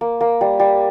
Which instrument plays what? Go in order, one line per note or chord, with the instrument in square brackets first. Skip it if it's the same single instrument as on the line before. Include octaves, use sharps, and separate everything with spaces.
[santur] A#3
A#3
G3
G3